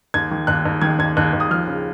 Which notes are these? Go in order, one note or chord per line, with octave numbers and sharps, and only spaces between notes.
D#2 G#6
D#3
D#2 F#6
D#2
D#3 G#6
D#2 G#6
D#2 F#6
D#2
D#6
F3 F6
C#3